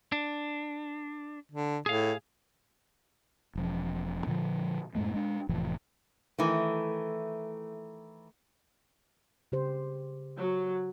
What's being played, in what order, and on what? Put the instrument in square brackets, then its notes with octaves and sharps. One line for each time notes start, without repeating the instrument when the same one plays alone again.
[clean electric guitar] D4
[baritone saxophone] D3
[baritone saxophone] A2 [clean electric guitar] G#4 F5
[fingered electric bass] E1 F3 C#4
A#2 D3 D#3 F3
F#2 A2 G#3 A3
G#3 D4
F1 A2 E3 F3
[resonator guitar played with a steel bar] D#3 E3 [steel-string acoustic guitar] A3
[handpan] C#3 G4 C5
[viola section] F#3